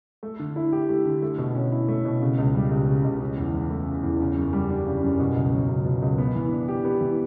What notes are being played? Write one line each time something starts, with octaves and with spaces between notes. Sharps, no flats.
A3
D3
E4
G4
A3
D3
A3
B2
C#4
E4
A3
B2
C#3
C#2
G3
C#2
C#3
C#2
C#3
E2
E3
A3
C#3
E2
C#3
F#2
G3
D4
C#3
F#2
B2
C#2
F#3
C#2
B2
C#2
B3
E3
D4
G4
B3
E3